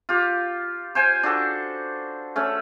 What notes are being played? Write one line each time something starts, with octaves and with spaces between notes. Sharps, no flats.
F4 G4
C5 G5 G#5
D4 F#4 A4
A3 C#4